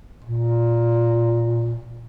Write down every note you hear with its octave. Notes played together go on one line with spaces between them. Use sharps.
A#2